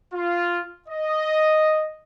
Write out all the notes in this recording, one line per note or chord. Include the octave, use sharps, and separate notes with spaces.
F4
D#5